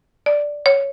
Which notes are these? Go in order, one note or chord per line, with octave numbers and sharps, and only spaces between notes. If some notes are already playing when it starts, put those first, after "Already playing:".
D5
C#5